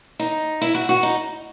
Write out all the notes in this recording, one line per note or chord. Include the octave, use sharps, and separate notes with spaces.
D#4
E4
F#4
F#4
D#4